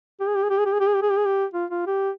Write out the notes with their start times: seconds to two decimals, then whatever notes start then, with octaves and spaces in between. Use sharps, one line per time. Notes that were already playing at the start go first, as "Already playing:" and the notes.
0.20 G4
0.27 G#4
0.35 G4
0.43 G#4
0.50 G4
0.58 G#4
0.66 G4
0.73 G#4
0.80 G4
0.87 G#4
0.95 G4
1.02 G#4
1.10 G4
1.17 G#4
1.25 G4
1.54 F4
1.71 F4
1.87 G4